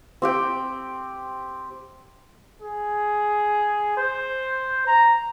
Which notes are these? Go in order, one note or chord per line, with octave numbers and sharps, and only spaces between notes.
C4 G4 G5
G#4
C5
A#5